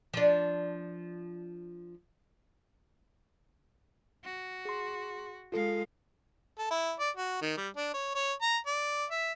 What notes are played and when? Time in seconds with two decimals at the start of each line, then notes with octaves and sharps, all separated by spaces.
0.14 F3 D4
4.24 F#4
4.65 G#4 C6
5.52 G#3 F4 A4 F5
6.58 A4
6.71 E4
6.99 D5
7.17 F#4
7.41 D#3
7.57 G3
7.76 D4
7.94 C#5
8.15 C#5
8.42 A#5
8.67 D5
9.11 E5